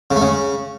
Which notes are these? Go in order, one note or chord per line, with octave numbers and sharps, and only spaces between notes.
C#3
A3
C#3